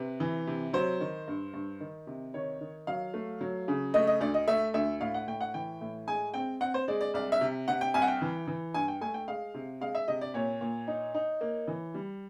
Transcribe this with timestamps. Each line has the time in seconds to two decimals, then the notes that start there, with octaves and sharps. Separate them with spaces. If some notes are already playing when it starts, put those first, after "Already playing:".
Already playing: C3 B4
0.20 E3
0.47 C3
0.73 F#3 C5
1.01 D#3
1.28 G2
1.54 G2
1.80 D#3
2.07 C3
2.34 D#3 C#5
2.61 D#3
2.87 F#3 F5
3.14 A3
3.41 F#3
3.68 C#3
3.94 A3 D#5
4.07 D#5
4.20 D2 D5
4.34 D#5
4.48 A3 E5
4.74 D2 E5
5.01 A2 F5
5.14 F#5
5.27 A2 G5
5.41 F#5
5.54 E3 G5
5.81 A2
6.07 G#3 G#5
6.34 C4 G5
6.61 C4 F#5
6.74 C5
6.88 G#3 D5
7.01 D5
7.14 C2 D5
7.32 E5
7.41 C3
7.68 C3 F#5
7.81 G5
7.94 C2 G#5
8.02 F#5
8.08 G5
8.21 E3
8.47 E3
8.74 G2 G#5
8.88 G5
9.01 A3 G#5
9.14 G5
9.28 G#3 F5
9.54 C3
9.81 G#3 F5
9.95 E5
10.08 C3 D#5
10.21 D5
10.34 A#2 C#5
10.61 A#2
10.88 D#4
11.14 D#4
11.41 A#3
11.68 E3
11.94 G3